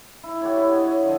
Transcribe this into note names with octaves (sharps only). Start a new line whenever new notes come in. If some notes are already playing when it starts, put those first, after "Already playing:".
E4
F#4 G4 A4 C#5
E4 F#4
C#5 D#5
C#5
D3 F3